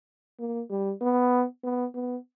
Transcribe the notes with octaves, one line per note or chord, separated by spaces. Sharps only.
A#3
G3
B3
B3
B3